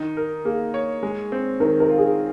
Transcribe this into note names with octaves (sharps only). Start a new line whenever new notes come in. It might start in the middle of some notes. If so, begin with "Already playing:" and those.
Already playing: D#3 D#4
A#4
A#3 G#4
C#5
G#3
C4
D#3 A#4
A#4
F4
G#4